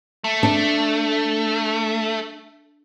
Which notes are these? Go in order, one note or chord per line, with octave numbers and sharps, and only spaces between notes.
A3
D4